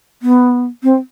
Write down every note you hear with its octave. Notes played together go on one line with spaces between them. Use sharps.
B3
C4